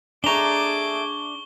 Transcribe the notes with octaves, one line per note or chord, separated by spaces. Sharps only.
G#3 A3 D4 G#4 A#5 C#6 D6 G7